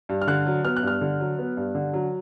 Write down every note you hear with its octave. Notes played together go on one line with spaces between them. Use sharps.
G2
F6
D3 F#6
F#3
B3 F6
F#6
G2 F6
D3
F#3
B3
G2
D3
F#3